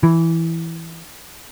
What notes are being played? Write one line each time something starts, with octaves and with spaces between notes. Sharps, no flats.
E3